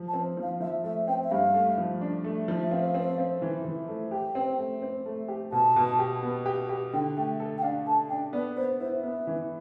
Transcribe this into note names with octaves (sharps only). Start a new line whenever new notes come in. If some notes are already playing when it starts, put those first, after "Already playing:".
Already playing: F3
A5
C4
F3
F5
F3 E5
A3 E5
C4 G5
E5
G2 F5
A3
F3
D4
A3
F3
E5
C4 F5
C4
C4
E3
E3
A3
G4 G5
C4
A3
C4
A3
G4
B2 A5
B2
G4
B3
G4
G4
D3 G5
A3 G5
A4
G5
D4 F5
A4 A5
D4 G5
B3 D5
B3 C5
E4 C5
B3 E5
E3